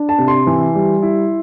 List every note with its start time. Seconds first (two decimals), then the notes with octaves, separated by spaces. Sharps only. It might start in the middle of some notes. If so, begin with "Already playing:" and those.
Already playing: D4
0.09 A5
0.18 C3
0.28 C6
0.47 E3
0.75 G3
1.02 E4